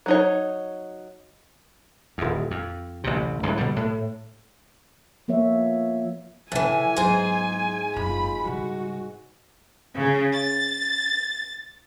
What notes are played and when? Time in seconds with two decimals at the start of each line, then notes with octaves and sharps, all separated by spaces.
0.06 F#3 D#4 C#5
2.18 D#1 E2
2.51 F2
3.04 A1 D2 C3
3.43 C#2 A2 D3 F#3
3.57 B2 D3 G3
3.76 A2
5.28 F3 A#3 B3 C#5 E5
6.52 A2 C#3 E3 F3 G#5
6.96 G#2 F#3 B3 G#4 C5
7.96 F#1 C#4 F4 B5
8.45 C#3 G3 F#4
9.95 C#3
10.33 A6